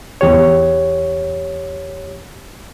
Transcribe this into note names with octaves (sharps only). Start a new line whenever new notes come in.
E2 G4 C#5